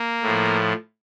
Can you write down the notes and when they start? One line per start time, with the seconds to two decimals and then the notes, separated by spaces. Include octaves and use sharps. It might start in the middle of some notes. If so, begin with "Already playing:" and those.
Already playing: A#3
0.22 A2 F3